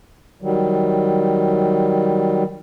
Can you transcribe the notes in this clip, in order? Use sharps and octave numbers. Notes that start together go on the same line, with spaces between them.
D#3 F#3 G3